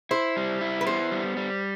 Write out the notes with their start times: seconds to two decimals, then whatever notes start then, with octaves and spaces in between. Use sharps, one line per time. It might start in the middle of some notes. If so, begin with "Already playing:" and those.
0.11 E4 C5
0.37 G3
0.61 E4
0.81 B4
0.87 B3 C5
1.11 G3
1.37 G3